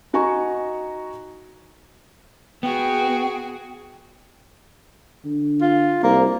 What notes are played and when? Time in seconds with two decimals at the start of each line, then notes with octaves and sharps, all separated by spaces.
0.13 D#4 F#4 G#5 A#5 C#6
2.63 B3 F#4 G#4 G5
5.25 D3
5.61 F4
6.03 C2 A#3